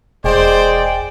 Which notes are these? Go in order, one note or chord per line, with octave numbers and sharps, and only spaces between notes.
E1 G#3 C5 D5 G5